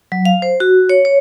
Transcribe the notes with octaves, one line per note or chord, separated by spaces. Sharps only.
F#3
F5
C5
F#4
C#5
C#5